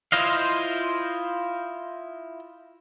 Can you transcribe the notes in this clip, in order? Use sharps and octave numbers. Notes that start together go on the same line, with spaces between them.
E4 F4 C5 D#5 F5